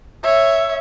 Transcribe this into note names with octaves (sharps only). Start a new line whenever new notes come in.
C#5 E5